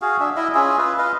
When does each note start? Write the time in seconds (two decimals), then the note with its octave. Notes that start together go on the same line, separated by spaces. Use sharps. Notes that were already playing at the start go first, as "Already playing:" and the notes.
0.02 F#4 G#4 F5
0.20 D4 E5
0.36 E4 D#5 E5
0.55 C#4 F4 G#4 E5
0.78 F4 B4
0.98 B4 D#5 F5